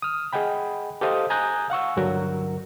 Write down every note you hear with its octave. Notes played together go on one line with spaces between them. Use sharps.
D#6 F6
G#4 D#5 F#5 G5 B5
G4 A4 C5 D#5 F5 D#6
G#5 A#5 D#6 F#6 G6
F5 F#5 C#6 E6
C#2 G2 D3 F#3 F#4 A#4